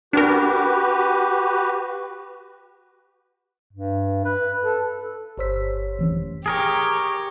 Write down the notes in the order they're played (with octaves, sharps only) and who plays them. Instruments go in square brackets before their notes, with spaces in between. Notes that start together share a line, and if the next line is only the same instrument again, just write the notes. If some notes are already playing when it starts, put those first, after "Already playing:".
[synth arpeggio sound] D4 A#4 [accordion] F#4 G4 B4
[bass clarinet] G2
B4
A4
[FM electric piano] G1 C5 B6 [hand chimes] G4 C#5 E6
[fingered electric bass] F1 E3 C#4
[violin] G4 [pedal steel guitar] G#4 A#4 C#5